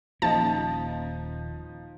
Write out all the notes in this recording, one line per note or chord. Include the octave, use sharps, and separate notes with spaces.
D#1 F3 A#3 C#4 D#4 D#5 A5